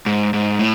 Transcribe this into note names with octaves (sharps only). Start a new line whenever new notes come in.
G#2
G#2
A2